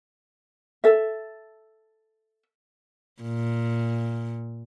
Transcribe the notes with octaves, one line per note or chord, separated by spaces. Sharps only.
A4 E5
A#2